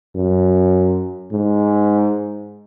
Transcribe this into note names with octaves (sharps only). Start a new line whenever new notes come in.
F#2
G#2